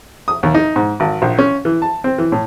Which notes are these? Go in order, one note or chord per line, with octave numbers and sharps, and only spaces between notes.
D#6
D#2
D#4
G#2
G#1
A#1
C#4
E3
A5
C4
E3
A2